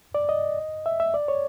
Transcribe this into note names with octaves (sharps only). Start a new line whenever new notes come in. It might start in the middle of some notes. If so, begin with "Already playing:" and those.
D5
D#5
E5
E5
D5
C#5